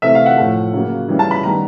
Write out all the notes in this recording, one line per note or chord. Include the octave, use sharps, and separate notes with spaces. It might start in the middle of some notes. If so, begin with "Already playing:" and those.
C3 E3 A3 C4 E5
F5
F#5
A2 F3 A3
C#3 F#3 A#3
C#3 E3 G3
A5
B5
D#3 G3 B3 A#5